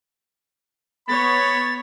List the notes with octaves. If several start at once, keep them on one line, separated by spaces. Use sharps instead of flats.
B3 C#5 B5 A6